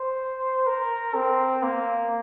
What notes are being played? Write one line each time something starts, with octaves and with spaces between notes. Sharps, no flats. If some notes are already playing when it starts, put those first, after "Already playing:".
Already playing: C5
A#4
C4
A#3